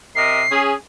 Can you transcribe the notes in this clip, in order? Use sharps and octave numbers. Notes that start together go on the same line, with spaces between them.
C3 A#4 D#5 C7
C#4 G#4